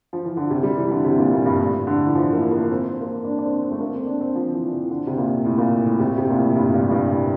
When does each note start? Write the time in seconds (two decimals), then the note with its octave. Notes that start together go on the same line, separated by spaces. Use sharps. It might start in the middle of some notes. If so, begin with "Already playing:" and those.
0.13 F3
0.25 E3
0.37 D3
0.50 C3
0.63 G3
0.77 E3
0.91 D3
1.04 C3
1.18 A#2
1.33 A#2
1.46 G2
1.60 A2
1.87 D3
2.06 E3
2.15 F3
2.33 A#3
2.51 A#3
2.70 C4
2.88 C4
3.01 A#3
3.07 C4
3.24 D4
3.39 D4
3.44 C4
3.62 C4
3.72 A3
3.81 A#3
3.94 C4
4.07 D4
4.21 C4
4.35 F3
4.53 E3
4.72 E3
4.90 D3
5.07 C3
5.18 A#2
5.45 A2
5.58 A#2
5.86 A2
5.99 C3
6.18 C3
6.29 A#2
6.37 A2
6.55 G2
6.74 G2
6.83 A2
6.91 G2